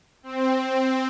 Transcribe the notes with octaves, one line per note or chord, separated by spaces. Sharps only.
C4